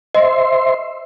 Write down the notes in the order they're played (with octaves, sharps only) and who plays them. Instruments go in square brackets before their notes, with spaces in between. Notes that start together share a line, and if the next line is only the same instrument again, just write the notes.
[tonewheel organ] C5 E5 C6 [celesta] D#5